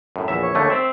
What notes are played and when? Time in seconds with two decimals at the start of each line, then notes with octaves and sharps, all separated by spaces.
0.16 F#2 A2
0.28 A#1 E2 E5
0.42 C#5
0.55 D#2 D3 A3
0.70 C4 E5